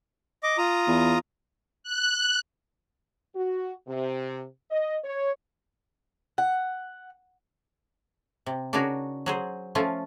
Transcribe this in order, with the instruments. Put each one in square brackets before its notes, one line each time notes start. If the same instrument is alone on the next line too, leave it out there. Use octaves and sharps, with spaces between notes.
[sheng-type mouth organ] D#5 D6
F4 A#5 D#6
[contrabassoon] E2
[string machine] F#6
[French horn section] F#4
C3
D#5
C#5
[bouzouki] F#5
[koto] C3
C#3 D4 D#4 F#4 A#4 C#5
F#3 G#4 C5
F3 A3 C#4 F4